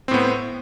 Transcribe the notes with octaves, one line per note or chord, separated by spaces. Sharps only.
A2 B3 C4